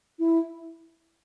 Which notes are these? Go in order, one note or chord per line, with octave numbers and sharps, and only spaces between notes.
E4